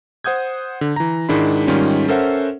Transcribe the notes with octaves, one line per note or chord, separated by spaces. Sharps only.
C5 F#5 D#6 G6 G#6
D3
E3 A#5
G#2 D#3 G#3 D4 E4 B5
G#2 D#3 G3 C#4 F4
C#4 A4 A#4 C5 E5 F#5